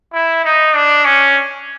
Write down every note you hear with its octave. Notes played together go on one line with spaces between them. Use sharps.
E4
D#4
D4
C#4